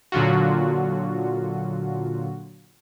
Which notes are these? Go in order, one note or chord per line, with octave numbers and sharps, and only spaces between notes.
A#2 D3 F#3 F4 F#4